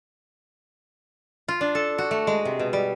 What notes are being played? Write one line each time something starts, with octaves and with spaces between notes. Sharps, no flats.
F4
D4
A4
F#4
A3
G#3
C3
B2
G3